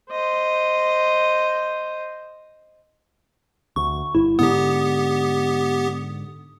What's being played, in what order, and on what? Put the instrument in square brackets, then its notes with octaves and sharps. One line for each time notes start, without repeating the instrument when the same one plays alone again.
[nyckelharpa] C5 D#5
[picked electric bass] D2 [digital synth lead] C#6
[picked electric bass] G1 [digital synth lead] E4
[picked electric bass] G#2 D3 [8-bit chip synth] B3 G4 [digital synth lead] D#6